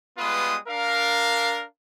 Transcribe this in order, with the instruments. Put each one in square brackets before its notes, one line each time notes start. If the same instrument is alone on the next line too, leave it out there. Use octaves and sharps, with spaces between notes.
[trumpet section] G3 G#3 B3 F4 B4 D#6
D4 A#4 F5